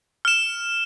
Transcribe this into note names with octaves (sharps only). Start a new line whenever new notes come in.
F6 E7